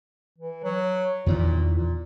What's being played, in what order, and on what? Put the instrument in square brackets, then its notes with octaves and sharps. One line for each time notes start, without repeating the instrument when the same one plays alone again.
[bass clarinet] E3
F#3
[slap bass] E2 D#3 E3 [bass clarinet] A#2
[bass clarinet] A#2